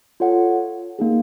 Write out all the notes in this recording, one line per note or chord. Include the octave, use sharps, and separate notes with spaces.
F4 A4 C#5 F#5
A#3 D#4 G#4